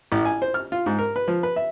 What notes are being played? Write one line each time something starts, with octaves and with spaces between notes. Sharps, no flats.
A1
G#5
C5
F6
F4
G#2
A#4
B4
F3
B4
E5